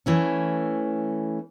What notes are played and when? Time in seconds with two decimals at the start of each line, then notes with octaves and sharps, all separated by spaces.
0.06 E3 A3 C#4